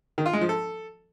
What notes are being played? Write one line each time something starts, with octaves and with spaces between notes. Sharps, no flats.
D#3
F4
G#3
F3
A4